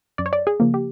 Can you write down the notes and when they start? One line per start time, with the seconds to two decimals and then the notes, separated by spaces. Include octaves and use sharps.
0.18 F#2 D5
0.26 C#5
0.33 D5
0.47 G#4
0.60 C#3 F3 A#3
0.74 G4